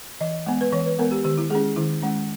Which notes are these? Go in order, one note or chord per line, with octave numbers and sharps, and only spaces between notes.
E3 D#5
G#3 B3
B4
E3 C#5
B4
G#3 B3 A#4
G4
D#3 G4
E4
G#3 C#4 G#4
D#3 E4
G#3 C#4